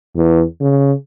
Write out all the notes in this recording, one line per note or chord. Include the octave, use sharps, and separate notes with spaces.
E2
C#3